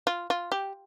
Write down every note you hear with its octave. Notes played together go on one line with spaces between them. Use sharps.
F4
F4
G4